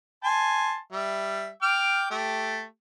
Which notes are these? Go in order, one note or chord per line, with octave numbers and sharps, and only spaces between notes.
G#5 A5 C6
G3 E5
G5 D6 F6
A3 G4